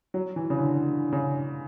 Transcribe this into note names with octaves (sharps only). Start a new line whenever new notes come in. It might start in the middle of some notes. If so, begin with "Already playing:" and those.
F#3
E3
C#3
D3
C#3